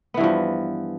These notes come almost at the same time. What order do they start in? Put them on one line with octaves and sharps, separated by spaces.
B3 E3 G2 F3